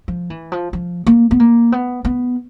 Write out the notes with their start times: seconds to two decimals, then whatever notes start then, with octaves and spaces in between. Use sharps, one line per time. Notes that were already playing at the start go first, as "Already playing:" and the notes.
0.08 F3
0.30 E3
0.52 F3
0.73 F3
1.07 A#3
1.31 B3
1.40 A#3
1.72 B3
2.05 B3